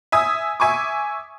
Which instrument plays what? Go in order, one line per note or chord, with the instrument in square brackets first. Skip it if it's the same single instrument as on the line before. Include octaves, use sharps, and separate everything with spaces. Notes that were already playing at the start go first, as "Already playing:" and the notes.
[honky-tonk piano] E5 G#5 D#6
E5 G#5 C#6 D6